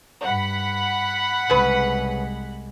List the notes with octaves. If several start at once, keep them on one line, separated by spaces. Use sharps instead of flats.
G2 F#5 B5
C2 C#3 G#3 B4